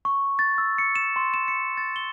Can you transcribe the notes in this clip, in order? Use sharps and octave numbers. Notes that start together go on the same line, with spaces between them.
C#6
A6
E6
C#7
E7
C6
E7
C#7
A6
G7